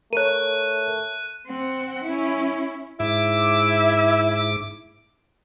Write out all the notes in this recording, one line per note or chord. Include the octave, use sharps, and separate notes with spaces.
A3 A#4 C#5 F#6 D#7
C4 F#5
C#4 E4
G#2 E4 D6